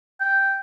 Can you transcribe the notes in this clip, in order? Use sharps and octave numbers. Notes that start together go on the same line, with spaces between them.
G5